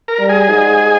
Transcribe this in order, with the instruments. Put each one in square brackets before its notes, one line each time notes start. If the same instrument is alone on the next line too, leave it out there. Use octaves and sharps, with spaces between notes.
[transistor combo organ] A#4
[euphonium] G3
[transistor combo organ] G#4
[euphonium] G#2